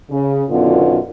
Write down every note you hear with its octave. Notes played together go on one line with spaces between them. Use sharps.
C#3
F#2 B2 D3 D#3 B3 F4